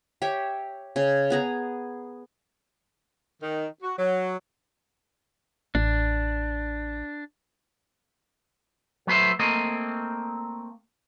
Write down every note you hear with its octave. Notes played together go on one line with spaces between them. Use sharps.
G4 C#5 E5
C#3
B3 G#4 A#5
D#3
F#4
F#3
A1 D4
F#3 A3 B4 C5 E5
A3 A#3 C4 D#5